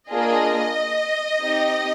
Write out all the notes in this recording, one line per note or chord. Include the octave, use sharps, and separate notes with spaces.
A#3 D4 F4 G#4 D#5
C4 D#4 G4